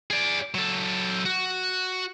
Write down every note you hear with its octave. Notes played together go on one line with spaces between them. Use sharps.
G#4 D5
F#3 A4
F#4